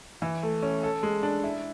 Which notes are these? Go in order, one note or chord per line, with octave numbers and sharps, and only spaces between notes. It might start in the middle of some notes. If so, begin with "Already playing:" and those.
E3
A3
C#4
A4
G#3
D4
E4